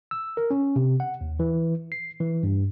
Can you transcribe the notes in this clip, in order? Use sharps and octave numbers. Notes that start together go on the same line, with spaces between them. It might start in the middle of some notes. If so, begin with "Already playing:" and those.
E6
A#4
C#4
C3
F#5
D#2
E3
C7
E3
G2